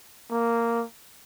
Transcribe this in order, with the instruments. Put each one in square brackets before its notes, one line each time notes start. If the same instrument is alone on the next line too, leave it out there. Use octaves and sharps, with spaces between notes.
[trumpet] A#3